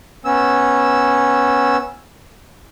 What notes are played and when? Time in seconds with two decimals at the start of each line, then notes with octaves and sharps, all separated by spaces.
0.25 B3 C#4 E6